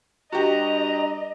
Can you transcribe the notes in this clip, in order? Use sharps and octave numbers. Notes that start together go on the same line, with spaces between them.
G2 F#4 G4 D#5 A#5